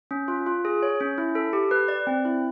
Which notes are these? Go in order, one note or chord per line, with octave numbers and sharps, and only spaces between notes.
C#4
F4
F4
G#4
C#5
C#4
E4
A4
G4
B4
D5
C4
E4